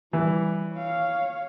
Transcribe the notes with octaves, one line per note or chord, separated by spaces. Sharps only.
E3 G3
C#5 F5